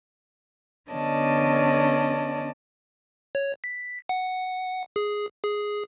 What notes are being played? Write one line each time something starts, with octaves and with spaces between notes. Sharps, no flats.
D3 B3 C#4 D5 D#5 A5
C#5
B6
F#5
G#4
G#4